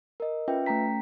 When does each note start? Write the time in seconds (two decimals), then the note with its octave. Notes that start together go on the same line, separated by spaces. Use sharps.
0.20 A#4 D#5
0.48 C#4 F4 B4 E5 G5
0.66 A3 C#4 G5 A#5 B6